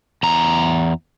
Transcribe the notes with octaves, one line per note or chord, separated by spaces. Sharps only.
E2 A#5